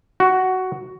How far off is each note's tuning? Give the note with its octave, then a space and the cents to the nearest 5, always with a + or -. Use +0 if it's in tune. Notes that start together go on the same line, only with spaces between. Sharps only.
F#4 +10